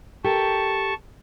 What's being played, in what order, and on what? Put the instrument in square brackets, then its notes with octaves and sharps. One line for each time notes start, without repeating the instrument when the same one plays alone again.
[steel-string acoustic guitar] G4 A4 A#4 [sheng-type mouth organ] A5 C#6